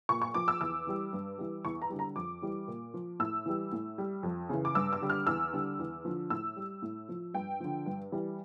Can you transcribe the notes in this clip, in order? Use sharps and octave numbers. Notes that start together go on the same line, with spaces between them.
A#2 C#6
C#6
F3 D6
E6
E2 E6
E3 G3
G2
E3 G3
E2 C#6
A#5
D3 G3
A#5
F2 D6
E3 G3
A#2
F3
A2 E6
E3 G3
A2
G3
F2
C#3 E3
D6
G2 E6
E6
D3 G3
F6
E2 E6
D3 G3
E2
D3 F3
A2 E6
G3
A2
F3
G2 G5
D3 F3
G2
E3 G3